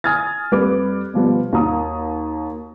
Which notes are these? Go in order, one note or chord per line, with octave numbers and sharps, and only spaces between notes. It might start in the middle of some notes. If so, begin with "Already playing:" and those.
G#5 D#6 F6 G#6 A6
F2 G3 B4 D6
B2 F3 G3 B3
D#2 A#3 F#4 A#5 D#6